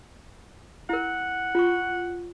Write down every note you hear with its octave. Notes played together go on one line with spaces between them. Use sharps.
E4 A#4 F#5
F4 C#6